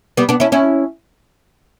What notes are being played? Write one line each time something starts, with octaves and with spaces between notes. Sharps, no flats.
G3 B3
B3 D4
C#4 E4
C#4 E4